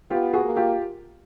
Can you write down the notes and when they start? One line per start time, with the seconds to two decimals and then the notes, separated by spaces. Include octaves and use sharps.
0.10 B3 F4 G4
0.33 F#4 G#4
0.45 A#3
0.56 F4 G4